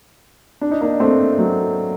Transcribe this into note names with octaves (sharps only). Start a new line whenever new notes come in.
D4
D#4
A#3 D4
A3 C4
F#3 A3